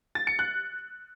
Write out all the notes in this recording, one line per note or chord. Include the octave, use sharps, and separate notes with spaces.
A6
C#7
F#6